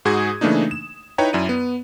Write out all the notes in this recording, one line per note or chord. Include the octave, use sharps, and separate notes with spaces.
G#2 F#4 G#4 D#6 G#6
C#3 E3 A3 A#3 D4 D#4
E7
D#4 E4 B4 C#5 G5 A#5
F#2 E4 D5 D#7
B3